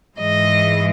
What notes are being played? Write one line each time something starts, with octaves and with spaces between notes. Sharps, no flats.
G#2 E3 G#3 D#5